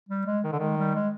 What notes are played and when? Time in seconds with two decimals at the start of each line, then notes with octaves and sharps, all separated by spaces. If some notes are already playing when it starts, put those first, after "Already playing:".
0.09 G3
0.26 G#3
0.44 D#3
0.52 D3
0.59 D#3 G#3
0.78 G3
0.95 G#3